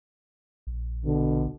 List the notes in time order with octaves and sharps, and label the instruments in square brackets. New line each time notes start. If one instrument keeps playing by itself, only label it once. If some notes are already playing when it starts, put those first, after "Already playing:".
[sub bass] A#1
[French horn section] B2 D3